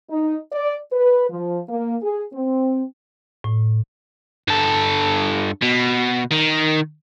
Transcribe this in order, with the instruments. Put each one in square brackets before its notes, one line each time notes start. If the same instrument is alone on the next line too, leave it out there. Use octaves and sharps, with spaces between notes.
[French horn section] D#4
D5
B4
F3
A#3
G#4
C4
[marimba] A2
[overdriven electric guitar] G2 A4
B2
D#3